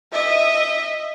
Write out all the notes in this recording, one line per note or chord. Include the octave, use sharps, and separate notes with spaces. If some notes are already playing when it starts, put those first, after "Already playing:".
D#5 E5